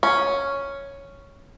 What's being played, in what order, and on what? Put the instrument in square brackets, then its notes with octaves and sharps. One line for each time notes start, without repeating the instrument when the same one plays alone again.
[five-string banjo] C#4